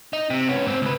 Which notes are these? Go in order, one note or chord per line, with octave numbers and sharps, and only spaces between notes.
D#4
C3
B3 C#4
G#2 C4
C#2 B4